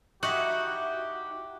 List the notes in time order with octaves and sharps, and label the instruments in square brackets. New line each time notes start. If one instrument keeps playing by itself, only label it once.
[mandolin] D#4 E4 [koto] F#4 [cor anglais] G4